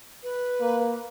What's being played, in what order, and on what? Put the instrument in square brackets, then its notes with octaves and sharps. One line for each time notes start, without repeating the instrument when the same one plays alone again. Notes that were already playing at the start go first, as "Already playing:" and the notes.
[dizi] B4
[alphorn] A#3